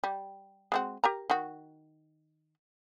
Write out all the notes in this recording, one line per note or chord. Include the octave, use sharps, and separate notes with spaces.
G3
G#3 C4 F#4
G4 A#4 A#5
D#3 F#4